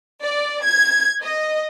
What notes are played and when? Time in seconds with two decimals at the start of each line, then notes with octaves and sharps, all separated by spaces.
0.21 D5
0.65 G#6
1.21 D#5